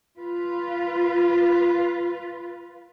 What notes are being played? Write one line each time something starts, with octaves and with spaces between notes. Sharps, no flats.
F4 B4